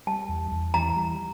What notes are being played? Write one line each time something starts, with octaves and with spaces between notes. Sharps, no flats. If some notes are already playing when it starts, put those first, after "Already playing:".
G3 A5
E2
E2
E3 A#5
G3